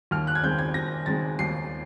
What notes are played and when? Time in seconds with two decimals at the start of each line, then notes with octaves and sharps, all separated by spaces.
0.11 D#2 F6
0.27 F#6
0.35 G#6
0.43 D#3 G#3 C4 G6
0.59 G#6
0.74 D#2 A#6
1.06 D#3 G#3 C4 A6
1.39 D#2 C7